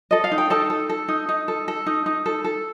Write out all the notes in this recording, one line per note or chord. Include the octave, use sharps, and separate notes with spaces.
A4 D#5
F5
D#4
G5
D#4 A4 A5
A4
A4
D#4
D#4
A4
A4
D#4
D#4
A4
A4